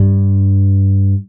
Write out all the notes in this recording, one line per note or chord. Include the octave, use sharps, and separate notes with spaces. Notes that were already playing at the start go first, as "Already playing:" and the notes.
Already playing: G2